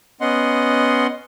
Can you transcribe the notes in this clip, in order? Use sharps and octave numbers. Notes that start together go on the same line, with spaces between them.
B3 C#4 D#5 F#5 C6